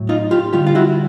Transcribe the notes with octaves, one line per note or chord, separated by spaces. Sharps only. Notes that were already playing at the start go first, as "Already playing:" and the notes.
Already playing: A2 F#3
D#4 F4
F4 G4
D3 G3 F4 G4
F4
E4 F#4